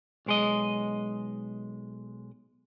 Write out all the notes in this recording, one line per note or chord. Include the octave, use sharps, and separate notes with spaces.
B1 G#3 D#5